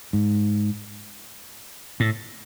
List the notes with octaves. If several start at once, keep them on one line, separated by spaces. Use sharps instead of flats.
G#2
A2